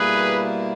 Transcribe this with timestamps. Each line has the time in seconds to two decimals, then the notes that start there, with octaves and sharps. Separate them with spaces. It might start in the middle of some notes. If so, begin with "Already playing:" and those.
Already playing: B2 G3 A#3 E4 G#4 B4